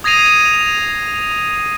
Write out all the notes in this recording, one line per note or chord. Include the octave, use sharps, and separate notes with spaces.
D#6 G#6 A#6 C7 D#7 F7